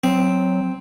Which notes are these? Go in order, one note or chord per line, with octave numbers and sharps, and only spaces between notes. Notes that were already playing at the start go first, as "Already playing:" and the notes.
F#3 C4